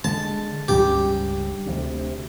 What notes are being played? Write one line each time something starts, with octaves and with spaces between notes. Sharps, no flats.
D3 G#3 A5
C#2 G2 C#3 G4
D2 C3